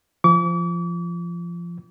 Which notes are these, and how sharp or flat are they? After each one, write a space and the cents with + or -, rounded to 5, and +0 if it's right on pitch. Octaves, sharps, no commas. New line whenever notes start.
F3 -20 D6 -40